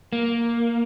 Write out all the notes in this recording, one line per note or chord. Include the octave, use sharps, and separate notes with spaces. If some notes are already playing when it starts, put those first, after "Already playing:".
A#3